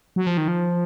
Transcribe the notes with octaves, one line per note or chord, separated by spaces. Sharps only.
F#3
F3
D#3
F3